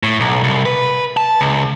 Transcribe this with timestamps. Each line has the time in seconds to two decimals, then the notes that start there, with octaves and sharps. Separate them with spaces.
0.03 A2
0.20 B1
0.43 C2
0.65 B4
1.17 A5
1.41 C#2